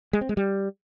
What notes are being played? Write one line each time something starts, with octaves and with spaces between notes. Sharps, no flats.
G#3
C4
G#3
G3